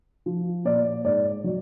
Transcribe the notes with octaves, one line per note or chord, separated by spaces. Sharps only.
F3
A#2 D5
G#2 D5
F#3